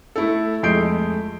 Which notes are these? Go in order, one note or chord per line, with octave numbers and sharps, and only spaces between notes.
A3 E4 A4
F2 G#3 A3 G6 C7 D7